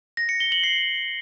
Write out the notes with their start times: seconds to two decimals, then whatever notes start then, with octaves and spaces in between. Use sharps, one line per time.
0.17 A#6
0.29 C#7
0.40 G7
0.52 F#7
0.64 C7